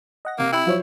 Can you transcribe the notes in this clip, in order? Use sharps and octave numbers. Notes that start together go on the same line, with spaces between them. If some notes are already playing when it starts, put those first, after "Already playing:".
D#5 F#5 A#6
C3 A#3
E4 G5 B5 E6
F3 F#3 F4 C5 C#5